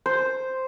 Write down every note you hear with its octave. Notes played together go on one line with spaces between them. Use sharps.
C5